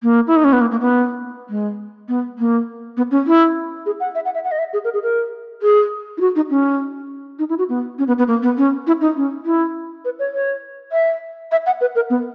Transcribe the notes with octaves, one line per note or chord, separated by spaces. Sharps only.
A#3
E4
D#4
C#4
B3
A#3
A#3
B3
G#3
B3
A#3
B3
C#4
E4
G#4
F#5
E5
F#5
E5
F#5
D#5
E5
G#4
A#4
G#4
A#4
G#4
E4
F#4
D#4
C#4
D#4
E4
F#4
B3
C#4
B3
B3
A#3
B3
C#4
E4
D#4
C#4
E4
B4
C#5
C#5
E5
E5
F#5
B4
A#4
B3